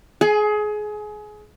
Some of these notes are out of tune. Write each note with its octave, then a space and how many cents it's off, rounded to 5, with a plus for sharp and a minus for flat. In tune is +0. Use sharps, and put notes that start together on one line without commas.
G#4 +25 G#5 +0